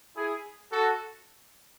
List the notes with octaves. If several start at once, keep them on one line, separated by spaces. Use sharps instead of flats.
E4 G#4
F#4 A4